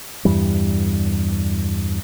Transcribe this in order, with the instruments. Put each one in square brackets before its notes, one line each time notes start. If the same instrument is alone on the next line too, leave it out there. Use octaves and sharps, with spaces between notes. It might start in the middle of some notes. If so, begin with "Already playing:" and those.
[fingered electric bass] E2 G2 E3 G3